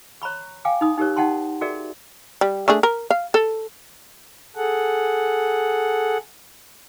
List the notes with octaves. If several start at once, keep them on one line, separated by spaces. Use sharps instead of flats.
C#5 A#5 B5 C#6
F5 G5 G#5 D6
D#4 B5 D#6
D#4 G4 A#4 C#5
D#4 F#5 G5 A5 C6
F#4 G#4 A#4 D5 E5
G3
A3 D4 G#4
A#4
F5
A4
G#4 A4 F#5